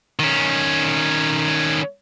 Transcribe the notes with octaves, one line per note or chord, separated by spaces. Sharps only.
D#3 C#4